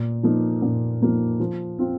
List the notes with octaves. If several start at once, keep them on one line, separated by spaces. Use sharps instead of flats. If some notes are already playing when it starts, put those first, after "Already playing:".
Already playing: A#2
F3 A#3 D#4
A#2
F3 A#3 D#4
F3
C4 F4